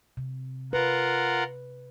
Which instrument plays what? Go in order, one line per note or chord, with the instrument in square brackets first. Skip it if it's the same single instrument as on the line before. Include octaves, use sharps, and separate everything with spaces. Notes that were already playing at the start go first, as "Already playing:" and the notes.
[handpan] C3
[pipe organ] F4 A#4 F#5 [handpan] B4